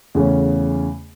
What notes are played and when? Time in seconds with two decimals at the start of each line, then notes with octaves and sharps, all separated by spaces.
0.15 E2 C#3 A3 C#4